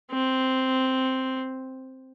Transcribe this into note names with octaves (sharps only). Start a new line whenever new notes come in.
C4